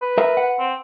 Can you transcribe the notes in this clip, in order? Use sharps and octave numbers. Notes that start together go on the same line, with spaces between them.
B4
A#4 E5 A#5
F#5
C4